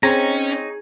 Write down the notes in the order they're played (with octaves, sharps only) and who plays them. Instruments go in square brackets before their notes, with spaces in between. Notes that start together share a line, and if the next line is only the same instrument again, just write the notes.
[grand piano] C4 [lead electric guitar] C#4 [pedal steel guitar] D#4 C#5 A#5 [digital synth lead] G#4